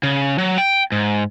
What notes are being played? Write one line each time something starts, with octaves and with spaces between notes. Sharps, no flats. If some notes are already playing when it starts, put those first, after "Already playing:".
C#3
F#3
G5
G#2